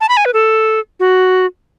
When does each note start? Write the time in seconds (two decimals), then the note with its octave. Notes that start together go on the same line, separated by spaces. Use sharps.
0.01 A5
0.09 B5
0.17 G#5
0.25 B4
0.34 A4
1.00 F#4